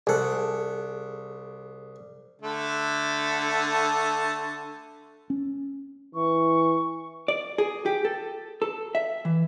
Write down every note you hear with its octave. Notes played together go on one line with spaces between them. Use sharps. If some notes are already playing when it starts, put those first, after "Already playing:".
C2 G#4 A4 F#5
D3 A3
C#4
E3 C#6
D5
G#4
G4
A4
A4
E5
E3